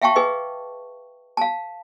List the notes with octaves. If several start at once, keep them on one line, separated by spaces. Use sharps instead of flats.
E5 F5 G5 A5 C#6
G#4 B4 D#5
F5 A5